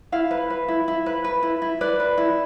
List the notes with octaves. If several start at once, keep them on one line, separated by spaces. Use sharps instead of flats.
E4 F5
B4
B4
E4
E4
B4
B4
E4
E4
B4 D5
B4
E4